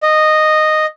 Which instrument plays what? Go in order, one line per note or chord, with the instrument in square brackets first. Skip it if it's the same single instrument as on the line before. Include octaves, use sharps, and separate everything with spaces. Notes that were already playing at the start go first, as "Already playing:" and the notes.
[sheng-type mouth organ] D#5